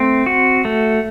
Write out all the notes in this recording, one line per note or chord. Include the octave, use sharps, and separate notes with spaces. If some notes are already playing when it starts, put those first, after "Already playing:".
Already playing: A3 C4
F#4
A3